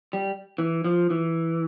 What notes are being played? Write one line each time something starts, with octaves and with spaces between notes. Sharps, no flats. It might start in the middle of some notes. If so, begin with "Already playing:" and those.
G3
E3
F3
E3